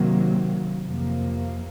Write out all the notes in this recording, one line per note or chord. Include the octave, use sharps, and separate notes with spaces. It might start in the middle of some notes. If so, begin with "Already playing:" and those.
Already playing: C3 D#3 F#3 A#3
F2 C3 F3 A#3